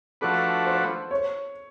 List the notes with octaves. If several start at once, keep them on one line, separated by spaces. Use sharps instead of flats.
F3 A3 D4 F#4 A4 B4
C5
C#5